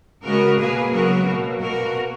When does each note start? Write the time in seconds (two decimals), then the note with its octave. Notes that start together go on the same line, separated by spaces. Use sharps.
0.23 C#3 G#3 B3 F#4 A#4
0.58 B2 A#3 G#4 B4
0.91 C#3 F#3 B3 F#4 A#4
1.25 B2 F#3 A#3
1.60 B2 A#3 F#4 A#4